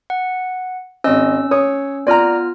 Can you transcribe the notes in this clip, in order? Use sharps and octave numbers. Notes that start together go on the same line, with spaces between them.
F#5
G#1 C#4 D#5 E6
C#5 D#6
B3 F4 D5 A#5 F6